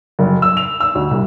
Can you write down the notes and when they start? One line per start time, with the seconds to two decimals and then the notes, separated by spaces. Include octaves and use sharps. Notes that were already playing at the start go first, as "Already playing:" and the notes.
0.19 F#1
0.42 E6
0.57 F7
0.80 E6
0.95 D2
1.11 C2